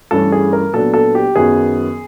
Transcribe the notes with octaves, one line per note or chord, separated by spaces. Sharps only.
G2 E3 A3 C#4 A4
G#4
A#4
A#2 F#3 B3 D4 A4
A4
G4
F#2 D#3 F#3 B3 G#4